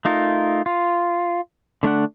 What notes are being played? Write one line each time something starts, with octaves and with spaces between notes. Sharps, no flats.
A3 D#4 F4 A#4
F4
D3 A3 D4 F#5